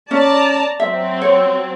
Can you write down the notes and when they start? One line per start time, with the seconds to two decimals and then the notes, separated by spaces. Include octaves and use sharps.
0.11 C#4 D5 A5 A#5
0.80 F#3 C4 E5
1.22 C#5